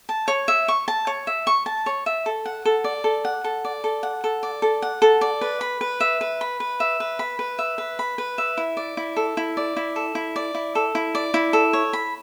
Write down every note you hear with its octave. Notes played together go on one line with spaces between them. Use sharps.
A5
C#5
E5
C#6
A5
C#5
E5
C#6
A5
C#5
E5
A4
F#5
A4
D5
A4
F#5
A4
D5
A4
F#5
A4
D5
A4
F#5
A4
D5
B4
B5
B4
E5
B4
B5
B4
E5
B4
B5
B4
E5
B4
B5
B4
E5
E4
D5
E4
A4
E4
D5
E4
A4
E4
D5
E4
A4
E4
D5
E4
A4
C#5
B5